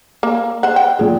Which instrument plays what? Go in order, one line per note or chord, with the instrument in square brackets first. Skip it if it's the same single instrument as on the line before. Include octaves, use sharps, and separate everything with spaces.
[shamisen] A#3
C5 F#5
G5
[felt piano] A#2 G#4